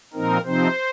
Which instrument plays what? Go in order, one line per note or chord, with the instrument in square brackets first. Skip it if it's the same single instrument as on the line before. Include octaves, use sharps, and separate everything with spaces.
[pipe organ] A#2 F3 C4 D#4 A#4
C3 F3 C4 D#4 C5